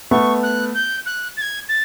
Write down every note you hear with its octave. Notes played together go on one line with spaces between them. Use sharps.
A3 B3 C#6
F#6
G6
F#6
A6
G#6
A6